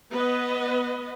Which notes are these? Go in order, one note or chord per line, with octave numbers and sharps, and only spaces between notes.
B3 B4 D#5